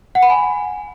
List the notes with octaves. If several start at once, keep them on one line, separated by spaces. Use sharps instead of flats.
F#5
B5
G#5